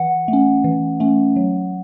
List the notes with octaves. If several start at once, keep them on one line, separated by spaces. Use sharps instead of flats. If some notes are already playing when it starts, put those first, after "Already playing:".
Already playing: E3 F#5
A3
C#4
E3
A3 C#4
F#3